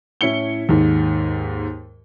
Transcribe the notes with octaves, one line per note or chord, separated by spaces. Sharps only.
A2 C#4 E4 C#7 G7
D#2 G#2